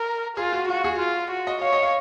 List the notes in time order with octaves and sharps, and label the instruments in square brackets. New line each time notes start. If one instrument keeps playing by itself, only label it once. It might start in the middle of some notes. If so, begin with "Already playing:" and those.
Already playing: [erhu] A#4
[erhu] F4 [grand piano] G#4
[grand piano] F#4
[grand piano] F4 [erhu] F#4
[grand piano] G#4
[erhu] F4
F#4
[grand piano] D#5
[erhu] C#5 [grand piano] F5
[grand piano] D#5
F5